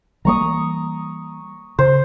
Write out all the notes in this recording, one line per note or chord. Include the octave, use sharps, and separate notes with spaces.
E3 G3 A#3 A#5 C#6 D#6
C#3 C5